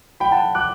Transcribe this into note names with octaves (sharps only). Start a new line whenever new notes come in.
G5 B5
F#5 A5
D6 F#6